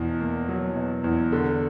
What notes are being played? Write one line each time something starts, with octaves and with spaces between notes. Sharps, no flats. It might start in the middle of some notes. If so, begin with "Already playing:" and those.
Already playing: E2 B2
A#3
F#3
B2
E2
D3